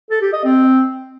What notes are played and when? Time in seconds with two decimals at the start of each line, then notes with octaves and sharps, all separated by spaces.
0.10 A4
0.22 G4
0.33 D#5
0.44 C4